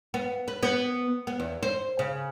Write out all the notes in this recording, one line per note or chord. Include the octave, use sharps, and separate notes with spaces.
B3
B4
B3
B3
E2
C5
C#3